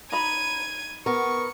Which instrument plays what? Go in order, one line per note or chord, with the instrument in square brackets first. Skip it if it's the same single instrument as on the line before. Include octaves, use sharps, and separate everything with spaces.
[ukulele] D#4 A#5 B5 [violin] G#6 D#7
[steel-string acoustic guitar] B3 A#4 [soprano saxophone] C#6 [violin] C#7